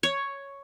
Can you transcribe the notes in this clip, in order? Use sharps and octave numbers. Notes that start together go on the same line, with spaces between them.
C#5